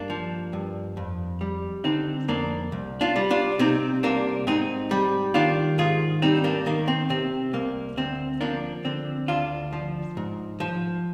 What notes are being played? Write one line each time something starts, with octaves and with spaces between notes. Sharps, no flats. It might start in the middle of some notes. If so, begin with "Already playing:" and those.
Already playing: G2 A#3 D4
F3
G2
F2
G3
D3 C4 D#4
F2 A#3 D4
C2
D4 F4
G3
D4 F4
C3 C4 D#4
C2 A#3 D4
G#2 C4 D#4
G3
D#3 D4 F4
G#2 F4 G#4
G3 C4 D#4
A#3 D4
D#3 A#3
C4
C3 C4
C2 A#3
D2 C4
F3 A#3 D4
D3 C4
D2 D4 F4
F3
G#2
F3